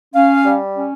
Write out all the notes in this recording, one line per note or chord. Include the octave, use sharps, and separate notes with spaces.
C#4 F5
G3
C#4